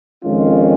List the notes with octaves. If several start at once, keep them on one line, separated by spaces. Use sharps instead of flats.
F2 D#3 G#3 C#4 F4